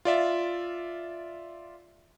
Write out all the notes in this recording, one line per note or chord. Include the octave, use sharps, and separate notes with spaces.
F4 D5 E5